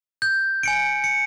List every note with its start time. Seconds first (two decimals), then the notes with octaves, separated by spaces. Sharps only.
0.22 G6
0.63 G#5 C#7 D7
1.04 C#7